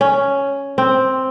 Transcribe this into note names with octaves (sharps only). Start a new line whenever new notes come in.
C#4
C4